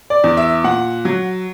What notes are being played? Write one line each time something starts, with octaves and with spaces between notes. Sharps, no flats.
D5
E2
E5
A#2 F#5
F#3